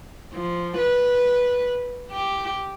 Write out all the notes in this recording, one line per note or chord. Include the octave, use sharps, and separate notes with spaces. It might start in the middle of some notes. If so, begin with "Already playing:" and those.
F3
B4
G4